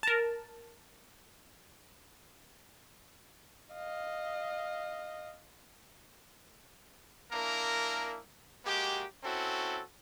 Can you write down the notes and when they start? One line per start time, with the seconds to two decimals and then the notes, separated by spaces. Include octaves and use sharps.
0.03 A#4 A5
3.73 D#5 F5
7.32 A#3 D4 E4 A#4
8.65 G#3 A#3 F#4 G4
9.24 C4 C#4 E4 F#4 A4